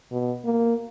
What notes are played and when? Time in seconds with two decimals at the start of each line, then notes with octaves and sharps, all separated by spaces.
0.11 B2
0.45 A#3